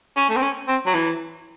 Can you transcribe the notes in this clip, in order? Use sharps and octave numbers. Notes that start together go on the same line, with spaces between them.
C#4
A3
C4
C#4
C4
F#3
E3